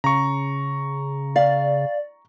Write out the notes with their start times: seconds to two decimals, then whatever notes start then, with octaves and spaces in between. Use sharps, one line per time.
0.04 C#3 A#5 C#6
1.36 D5 F5